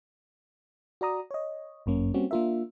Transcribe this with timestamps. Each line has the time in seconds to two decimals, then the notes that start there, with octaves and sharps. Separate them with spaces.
1.01 F#4 D5 A#5 D#6
1.31 C#5 D#5
1.86 G1 F#2 A#3 C#4
2.14 G3 A#3 C4 C#4 F#4
2.31 A#3 D4 F4 A#4 E5